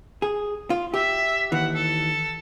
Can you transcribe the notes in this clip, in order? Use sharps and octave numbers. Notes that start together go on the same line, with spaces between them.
G#4
F4
G4 E5
D#2 E3 F#5
A4